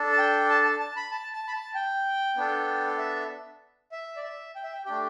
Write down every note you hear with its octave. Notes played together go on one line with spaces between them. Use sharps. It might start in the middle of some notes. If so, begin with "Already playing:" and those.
Already playing: D4 A4
A5
G5
A5
A5
A5
B5
A5
A5
B5
A5
G5
B3 D4 A4
E5
E5
D5
E5
G5
E5
G5
A3 D4 G4 G5